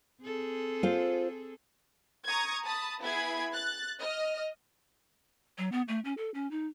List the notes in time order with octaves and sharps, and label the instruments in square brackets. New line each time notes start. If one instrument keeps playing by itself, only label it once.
[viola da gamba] C4 G#4 A4
[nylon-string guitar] F4 C5
[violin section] A#5 C#6 D#6 G#6
A5 B5 D#6
B3 E4 G#4 B5 G#6
F#6 A6
D#5 F6
[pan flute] F#3
B3
A3
C#4
A4
C#4
D#4